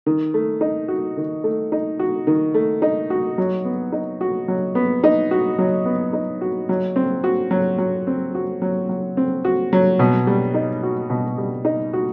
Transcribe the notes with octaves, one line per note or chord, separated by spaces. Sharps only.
D#3
A3
D#4
F#4
D#3
A3
D#4
F#4
D#3
A3
D#4
F#4
F#3
B3
D#4
F#4
F#3
B3
D#4
F#4
F#3
B3
D#4
F#4
F#3
C4
F#4
F#3
F#3
C4
F#4
F#3
F#3
C4
F#4
F#3
B2
G3
D#4
F#4
B2
G3
D#4
F#4